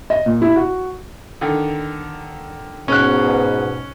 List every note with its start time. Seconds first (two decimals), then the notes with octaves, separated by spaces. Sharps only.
0.10 D#5
0.26 A#2
0.42 E4
0.56 F#4
1.41 D3 D#3
2.88 G#2 B2 C#4 F#6